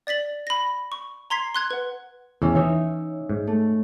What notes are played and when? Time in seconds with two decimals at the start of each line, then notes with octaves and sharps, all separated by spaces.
0.07 D5 A6 B6 F#7
0.47 B5 A#6
0.92 C#6
1.30 A#5 C6 G#6 B6 C7
1.55 C6 F#6 G#6
1.71 B4 F#5
2.42 E2 E3 C#4
2.55 E3 D#4 C#5 E5
3.30 G#2
3.47 A3